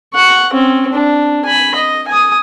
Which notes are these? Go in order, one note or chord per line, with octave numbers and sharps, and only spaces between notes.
F#5 C#6
C4 C#4
D4
G#5 B5
D#5
G#5 D#6